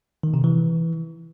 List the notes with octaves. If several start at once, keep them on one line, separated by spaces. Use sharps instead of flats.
D#3
C3
E3